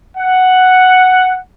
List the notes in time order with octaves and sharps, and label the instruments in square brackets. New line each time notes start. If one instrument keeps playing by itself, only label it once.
[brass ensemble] F#5